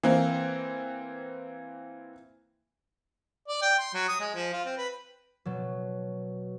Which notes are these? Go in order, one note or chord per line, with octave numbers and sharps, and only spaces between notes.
E3 A#3 C4
D5
G5
C6
F#3
D#6
G#3
F3
F4
C4
B4
B2 F#3